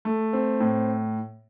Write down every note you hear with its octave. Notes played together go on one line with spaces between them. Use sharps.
A3
C4
A2